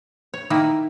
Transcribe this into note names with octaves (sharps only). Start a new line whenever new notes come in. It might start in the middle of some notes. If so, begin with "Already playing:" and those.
C#5
D#3 A#3 D#4 E4